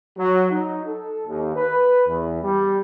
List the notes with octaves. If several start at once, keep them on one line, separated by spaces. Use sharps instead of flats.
F#3
D#4
A4
D#2
B4
E2
G3